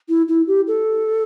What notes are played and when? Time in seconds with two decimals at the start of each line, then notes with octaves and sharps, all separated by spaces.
0.09 E4
0.28 E4
0.47 G4
0.67 A4